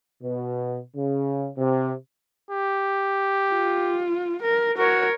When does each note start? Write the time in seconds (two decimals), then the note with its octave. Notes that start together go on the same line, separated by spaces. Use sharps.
0.22 B2
0.96 C#3
1.57 C3
2.51 G4
3.52 F4
4.42 A#4
4.77 F#4 A#4 C#5